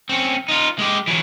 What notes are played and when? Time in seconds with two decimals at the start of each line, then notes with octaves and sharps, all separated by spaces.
0.09 C4 C#4
0.49 D#4 F4
0.79 G#3 G4
1.07 E3 F#3